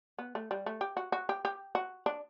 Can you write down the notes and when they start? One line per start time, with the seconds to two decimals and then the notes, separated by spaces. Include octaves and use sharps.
0.19 B3
0.35 A3
0.51 G3
0.66 A3
0.81 G4
0.97 F#4
1.12 F#4
1.29 G4
1.45 G4
1.75 F#4
2.06 D4